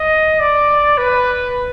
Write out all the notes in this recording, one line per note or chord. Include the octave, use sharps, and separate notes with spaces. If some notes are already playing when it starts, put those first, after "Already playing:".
Already playing: D#5
D5
B4